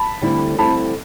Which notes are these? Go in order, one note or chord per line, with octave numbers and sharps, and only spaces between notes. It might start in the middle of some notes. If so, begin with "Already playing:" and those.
Already playing: A5 B5
D2 D3 G3 C4 E4
D2 D3 G3 C4 E4 A5 B5